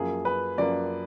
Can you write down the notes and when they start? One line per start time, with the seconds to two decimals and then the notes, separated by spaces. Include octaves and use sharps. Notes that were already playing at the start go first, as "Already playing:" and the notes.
Already playing: F#2 F3 A#3 G#4
0.25 B4
0.58 F#2 F3 A#3 D5